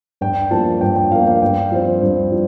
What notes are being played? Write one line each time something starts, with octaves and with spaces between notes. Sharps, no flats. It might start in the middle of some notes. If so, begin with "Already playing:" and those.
G2 G5
F3 A#3 A5
G2 G5
G5
F3 A#3 F5
F5
G2 G5
F3 C4
G2
F3